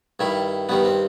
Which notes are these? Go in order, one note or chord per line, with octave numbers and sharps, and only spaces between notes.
G2 D#3 G3 E4
G2 D#3 G3 B3
C4